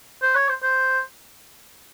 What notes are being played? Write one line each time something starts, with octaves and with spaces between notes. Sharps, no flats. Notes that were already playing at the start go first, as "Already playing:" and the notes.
C5
C#5
C5
C5